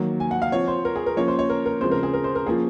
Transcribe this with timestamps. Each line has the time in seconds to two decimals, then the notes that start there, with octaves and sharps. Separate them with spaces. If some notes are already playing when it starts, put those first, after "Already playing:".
Already playing: D#3 F#3 A#3
0.20 G#5
0.31 F#5
0.42 F5
0.52 F3 C4 C#5
0.68 C5
0.85 A#4
0.96 G#4
1.06 A#4
1.16 F3 A#3 C#4 C#5
1.28 C5
1.39 C#5
1.50 A#4
1.66 A#4
1.81 C#3 F3 G#3 C4 C5
1.91 A#4
2.03 G#4
2.13 A#4
2.24 C5
2.35 A#4
2.46 F3 A#3 C#4 G#4